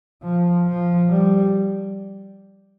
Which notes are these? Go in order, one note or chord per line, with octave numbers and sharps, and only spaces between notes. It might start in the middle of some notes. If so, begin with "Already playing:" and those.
F3
F3
G3